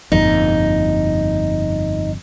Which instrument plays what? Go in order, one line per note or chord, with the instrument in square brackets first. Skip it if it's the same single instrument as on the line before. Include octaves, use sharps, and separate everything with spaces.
[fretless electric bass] G1 F2 A#2 [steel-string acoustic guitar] D#4